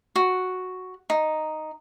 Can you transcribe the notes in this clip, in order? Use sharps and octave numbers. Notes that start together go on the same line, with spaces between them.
F#4
D#4